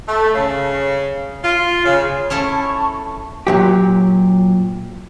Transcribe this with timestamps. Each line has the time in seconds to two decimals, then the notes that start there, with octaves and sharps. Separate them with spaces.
0.08 A3
0.34 C#3
1.43 F4
1.84 C#3
2.30 C#4 E4 A4 A5 C#6
3.47 A#2 F#3 G4